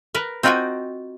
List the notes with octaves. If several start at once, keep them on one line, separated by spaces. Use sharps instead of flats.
A#4 B4
C4 D#4 F4 F#4 G5 G#5